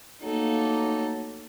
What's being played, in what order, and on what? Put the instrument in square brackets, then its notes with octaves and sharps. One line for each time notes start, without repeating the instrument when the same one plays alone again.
[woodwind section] F#3 A3 A#3 [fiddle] D#4 A4